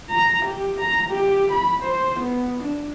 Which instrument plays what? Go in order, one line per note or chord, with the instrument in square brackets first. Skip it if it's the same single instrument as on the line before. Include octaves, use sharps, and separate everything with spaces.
[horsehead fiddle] A#5
G4
A#5
G4
B5
C5
B3
D4